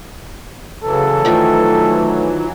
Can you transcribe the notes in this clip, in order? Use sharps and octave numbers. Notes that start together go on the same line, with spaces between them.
C#3 E3 F#3 A4
D#3 F3 A3